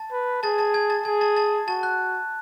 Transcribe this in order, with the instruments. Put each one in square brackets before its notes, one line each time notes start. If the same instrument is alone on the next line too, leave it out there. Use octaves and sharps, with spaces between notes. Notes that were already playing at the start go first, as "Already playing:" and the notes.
Already playing: [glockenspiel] A5 A6
[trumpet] B4
[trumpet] G#4 [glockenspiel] A5 A6
[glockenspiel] A5 A6
G#5 G#6
A5 A6
[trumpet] G#4 [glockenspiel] G#5 G#6
[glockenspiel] A5 A6
A5 A6
[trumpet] F#4 [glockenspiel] A5 A6
[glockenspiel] F#6